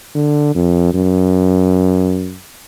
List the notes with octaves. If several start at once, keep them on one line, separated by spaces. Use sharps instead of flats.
D3
F2
F#2